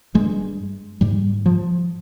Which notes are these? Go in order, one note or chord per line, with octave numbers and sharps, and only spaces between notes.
G2 G#3
G#2 G3
F3